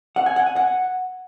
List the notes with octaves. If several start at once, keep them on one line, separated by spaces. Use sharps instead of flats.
F#5
G#5
F#5
G#5
F#5